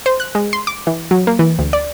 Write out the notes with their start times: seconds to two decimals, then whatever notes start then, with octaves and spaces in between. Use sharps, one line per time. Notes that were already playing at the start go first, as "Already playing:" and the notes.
0.06 C5
0.20 F#6
0.35 G#3
0.53 C6
0.67 D6
0.87 E3
1.11 F#3
1.27 A#3
1.39 E3
1.59 D2
1.73 D5